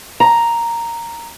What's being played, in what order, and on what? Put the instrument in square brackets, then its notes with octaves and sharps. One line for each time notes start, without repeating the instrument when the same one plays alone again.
[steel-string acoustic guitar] A#5